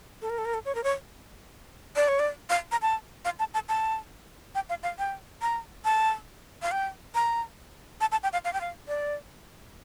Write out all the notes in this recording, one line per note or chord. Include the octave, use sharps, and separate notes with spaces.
A4
A#4
A4
A#4
A4
C#5
A#4
C#5
D5
C#5
D5
F5
A#5
A5
F5
A5
A5
A5
G5
F5
F5
G5
A#5
A5
F5
G5
A#5
A5
A5
G5
F5
F5
G5
F5
D5